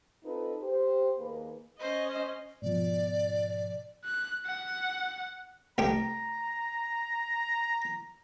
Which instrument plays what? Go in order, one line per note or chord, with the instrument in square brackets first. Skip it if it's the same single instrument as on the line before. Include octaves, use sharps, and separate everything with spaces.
[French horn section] C4 D#4 F4 A4 B4
G4 C5
D#2 A#3 G#4 B4
[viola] C#4 D#5 [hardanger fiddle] C5
[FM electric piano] G#2 B2 F3 [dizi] D5
[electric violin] F#6
F#5
[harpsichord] C2 A3 G4 [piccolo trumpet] A#5